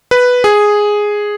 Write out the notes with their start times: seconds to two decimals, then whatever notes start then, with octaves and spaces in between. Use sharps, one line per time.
0.11 B4
0.44 G#4